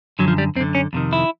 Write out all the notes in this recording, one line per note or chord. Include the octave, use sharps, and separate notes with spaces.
F#2 D3 F#3
F3
G3
F#2 D3 C4
C#4
F2 C3 D#3
E4